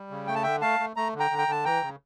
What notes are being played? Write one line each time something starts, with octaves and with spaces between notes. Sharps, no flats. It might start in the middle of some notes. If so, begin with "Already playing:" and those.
Already playing: G3
C#3
A3 G5
A5
D3 E5 G5
A3 F5 A5
A3
A3 A#5
D3
G5 A#5
D3
G5
D3 A5
E3 G5 A#5
C#3